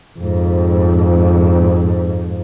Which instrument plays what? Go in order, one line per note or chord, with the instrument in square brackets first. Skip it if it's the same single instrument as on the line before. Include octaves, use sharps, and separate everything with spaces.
[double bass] F2 G#2